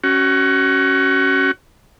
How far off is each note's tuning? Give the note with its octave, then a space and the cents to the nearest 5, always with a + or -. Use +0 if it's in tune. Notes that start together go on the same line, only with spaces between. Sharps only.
C#4 +0 F#4 +30